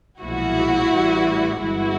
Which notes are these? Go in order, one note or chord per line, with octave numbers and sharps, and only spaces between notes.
B1 A#2 F3 G#3 E4 F#4
A1 A2 E3 G3
G1 G2 E3 G#3 E4 F#4